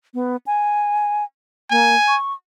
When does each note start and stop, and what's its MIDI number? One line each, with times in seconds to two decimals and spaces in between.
0.14 0.36 59
0.46 1.24 80
1.70 1.95 58
1.70 2.16 80
2.08 2.33 85